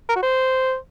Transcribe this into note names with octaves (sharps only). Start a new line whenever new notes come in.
A#4
F#4
C5